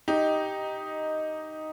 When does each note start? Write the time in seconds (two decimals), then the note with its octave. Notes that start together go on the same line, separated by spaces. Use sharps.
0.08 D#4 G4